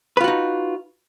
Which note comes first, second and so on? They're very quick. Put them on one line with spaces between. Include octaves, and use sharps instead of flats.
B4 F4 F#4 D#4